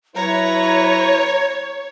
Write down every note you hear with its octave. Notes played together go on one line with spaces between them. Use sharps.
F#3 E4 B4 C#5 A#5